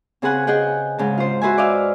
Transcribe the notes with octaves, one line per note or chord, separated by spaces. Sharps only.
C#3 C4 G#4 B4 F#5 G#5
G#4 D#5 F#5 G5
G#2 C#3 A5
F4 C5
F#4 B4 C5 E5 G#5
D5 D#5 F5 E6